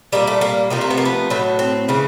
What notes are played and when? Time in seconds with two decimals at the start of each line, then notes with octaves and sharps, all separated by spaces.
0.12 A#2 G3 A#3
0.27 A3
0.41 A#3
0.70 C3 F3 A3 A#3
0.81 A#3
0.91 B3
0.97 A#3
1.05 B3
1.30 A2 F#3 A3
1.59 C4
1.88 C#3 E3 A3